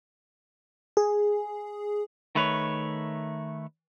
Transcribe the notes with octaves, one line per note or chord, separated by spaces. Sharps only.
G#4
D#3 A3 B4 C#5